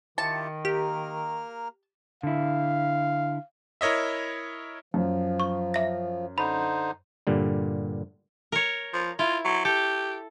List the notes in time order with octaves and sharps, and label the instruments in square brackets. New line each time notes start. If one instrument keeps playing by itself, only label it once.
[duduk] D#3 [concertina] E4 F4 G4 [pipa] A5 [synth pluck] C#7
[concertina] A#3 A#4 F6 [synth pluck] G4
[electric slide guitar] D3 E4 [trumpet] F5
[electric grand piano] E4 A#4 C#5 D#5 E5
[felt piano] F#2 [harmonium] F3
[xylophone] C#6
E5 A#6
[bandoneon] D3 D#4 C5 [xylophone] B5
[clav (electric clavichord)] G2 A#2 D3 G3
[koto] A#4 C#5
[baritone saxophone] F3
[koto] E4 [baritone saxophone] F4
[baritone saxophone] F#3
[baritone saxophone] G4 [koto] A4